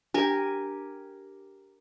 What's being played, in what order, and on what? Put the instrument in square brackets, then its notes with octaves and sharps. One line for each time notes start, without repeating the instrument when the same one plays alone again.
[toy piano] D4 [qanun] G4 A#4 G#5